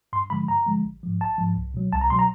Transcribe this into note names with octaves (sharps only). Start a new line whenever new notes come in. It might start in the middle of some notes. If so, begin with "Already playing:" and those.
G2 C6
D3 F3 G#3 B5
G2 A#5
D3 F3 G#3
A1
G#2 F3
A1 A5
G#2 F3
C2
B2 F#3
C2 A5
A#5
B2 F#3 C6
A#5